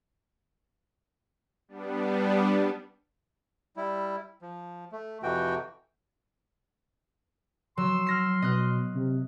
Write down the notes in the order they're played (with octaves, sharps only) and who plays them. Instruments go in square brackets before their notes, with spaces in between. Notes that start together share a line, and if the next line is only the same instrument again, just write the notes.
[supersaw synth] G3 B3 D4
[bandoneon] G3 E4
F3
A3
F2 C3 E3 F#4 G5
[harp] F#3 [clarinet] C6 [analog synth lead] E6
[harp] F6 A#6 C7
[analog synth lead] B2 [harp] D#5 F6 F#6
[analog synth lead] C3